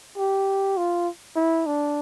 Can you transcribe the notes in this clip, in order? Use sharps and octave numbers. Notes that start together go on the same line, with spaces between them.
G4
F4
E4
D4